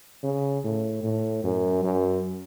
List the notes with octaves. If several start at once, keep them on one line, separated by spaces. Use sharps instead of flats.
C#3
A2
A2
F#2
F#2